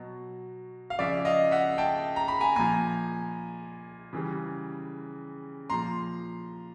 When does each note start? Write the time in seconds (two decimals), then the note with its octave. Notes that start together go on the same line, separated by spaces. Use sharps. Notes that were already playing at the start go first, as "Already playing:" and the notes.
Already playing: B2 F#3
0.90 F5
0.99 C#3 F3 D5 E5
1.25 D#5 F5
1.51 E5 F#5
1.78 G5 A5
2.16 A#5
2.28 B5
2.40 G#5 A#5
2.56 A#2 F3 G#5 A#5
4.13 C#3 E3 G3
5.70 A#2 F3 A#5 C6